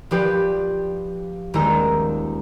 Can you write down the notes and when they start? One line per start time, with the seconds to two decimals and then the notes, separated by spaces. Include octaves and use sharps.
0.11 F3 D4 G4 B4
1.54 D#1 G#3 D#4 A#5 E6